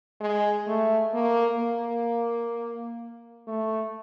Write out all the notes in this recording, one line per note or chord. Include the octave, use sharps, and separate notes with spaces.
G#3
A3
A#3
A#3
A3